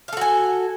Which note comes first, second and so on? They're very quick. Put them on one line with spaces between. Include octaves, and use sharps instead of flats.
F5 A4 F#4 G#5